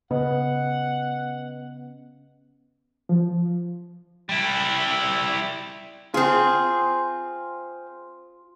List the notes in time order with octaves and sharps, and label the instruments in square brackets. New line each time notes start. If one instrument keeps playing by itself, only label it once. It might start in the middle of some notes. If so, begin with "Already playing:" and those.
[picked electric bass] C#3 [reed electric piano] B3 [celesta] B4 D#5 [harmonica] F#5
[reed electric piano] F3
[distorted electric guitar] G3 E4
[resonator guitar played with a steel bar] C4 G#4 [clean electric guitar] F4